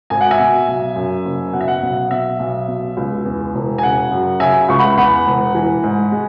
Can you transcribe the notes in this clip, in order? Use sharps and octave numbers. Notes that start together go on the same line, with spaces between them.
G#1 G#5
F#5
E5 G#5
B2
B1
F#2
F#1
B2 F#5
E5
F#5
B1
B2 E5
B1
B2
C#2
E2
E1
G#5
C#3 F#5
F#2
C#3 E5 G#5
C#2 C#6
F#5 B5
E2 F#5 B5
E1
E3
G#2
G#3